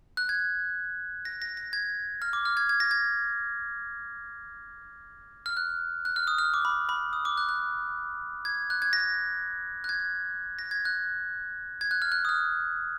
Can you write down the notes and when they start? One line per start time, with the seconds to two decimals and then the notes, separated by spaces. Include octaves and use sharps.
0.17 F#6
0.29 G#6
1.25 A#6
1.42 A#6
1.57 A#6
1.73 G#6
2.22 F6
2.33 D6
2.45 F6
2.57 G#6
2.69 G#6
2.80 A#6
2.91 G#6
5.46 F6
5.57 F#6
6.05 F#6
6.16 F6
6.27 D#6
6.38 F6
6.54 D6
6.65 B5
6.89 B5
7.13 D#6
7.25 D6
7.37 F#6
7.49 F#6
8.45 G#6
8.70 F#6
8.82 G#6
8.93 A#6
9.84 F#6
9.89 G#6
10.59 A#6
10.71 G#6
10.85 F#6
11.81 G#6
11.91 F#6
12.02 F6
12.12 F#6
12.25 D#6
12.29 F6